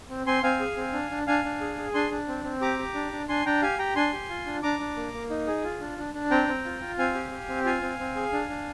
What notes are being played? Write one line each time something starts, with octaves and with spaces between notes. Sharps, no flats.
C4
C4 G#5 C6
C4 F5 G#5
G#4
C4
D4
D4
D4 F5 G#5
D4
G#4
G#4
D4 G#5 C6
D4
C4
C4
G4 A#5 D6
G4
D4
D4
D4 G#5 C6
D4 G5 A#5
G4 F5 G#5
G4 G5 A#5
D4 G#5 C6
G4
F4
D4
D4 A#5 D6
D4
A#3
A#3
D#4
G#4
F4
D4
D4
D4
C4 G5 A#5
C4
F4
F4
C4 F5 G#5
G4
G4
C4
F4 F5 G#5
C4
C4
G#4
D4
D4